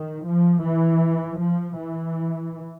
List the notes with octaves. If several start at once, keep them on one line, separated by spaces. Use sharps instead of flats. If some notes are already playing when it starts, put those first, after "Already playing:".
Already playing: D#3
F3
E3
F3
E3